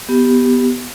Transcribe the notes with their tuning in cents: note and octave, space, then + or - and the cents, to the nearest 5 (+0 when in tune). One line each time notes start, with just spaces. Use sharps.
B3 +0 G4 +0